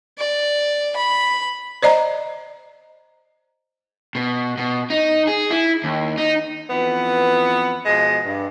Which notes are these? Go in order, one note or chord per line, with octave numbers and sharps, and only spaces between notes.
D5
B5
C5 D5 D#5 A#5
B2
B2
D#4
G#4
E4
D#2
D#4
F2 E3 B3
B2 F3 G#3
G2